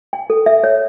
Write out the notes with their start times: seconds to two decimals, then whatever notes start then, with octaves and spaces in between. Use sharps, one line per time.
0.13 G5
0.30 A4
0.46 E5
0.64 C#5